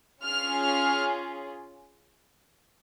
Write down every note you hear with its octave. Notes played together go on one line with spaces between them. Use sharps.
C#4 F4 G#4 F6
F6